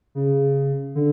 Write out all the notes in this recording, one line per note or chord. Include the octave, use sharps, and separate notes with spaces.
C#3
D3